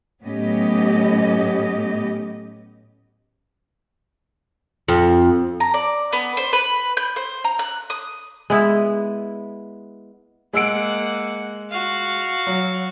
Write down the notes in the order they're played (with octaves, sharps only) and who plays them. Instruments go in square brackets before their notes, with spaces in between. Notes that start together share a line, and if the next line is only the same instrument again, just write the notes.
[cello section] A2 F#3 B3 C#4 G4 D#5
[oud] F2
[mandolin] A#5
D5
B3
C5
B4
G6
C5
A#5
F#6
D#6
[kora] G#3 B3 E4
[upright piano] G#3 E6 D7 [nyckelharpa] A#3 F#5
[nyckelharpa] F#4 F5
[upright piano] F#3